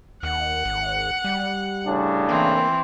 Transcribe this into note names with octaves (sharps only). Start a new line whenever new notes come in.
D#2 F#5
G#1
G3
A2 C#3 D4
E3 A#3 C4